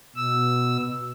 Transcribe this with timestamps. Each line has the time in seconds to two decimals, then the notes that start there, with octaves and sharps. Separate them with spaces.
0.16 B2 E6